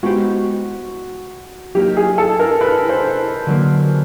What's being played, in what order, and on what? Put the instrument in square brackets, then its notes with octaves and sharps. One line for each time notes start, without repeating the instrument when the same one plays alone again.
[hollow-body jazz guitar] G#3 B3 D#4 G4 C5 [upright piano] F#4
[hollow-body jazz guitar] F#3 A#3 D#4 [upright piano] G4
[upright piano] G#4
A4
A#4
B4
C5
[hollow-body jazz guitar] D3 F#3 A#3